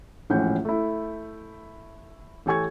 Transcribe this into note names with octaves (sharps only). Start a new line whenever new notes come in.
E1 A#1 A2 C#4 F#5 G6
A3 E4
A1 G4 A4 G#5 C#6 G#6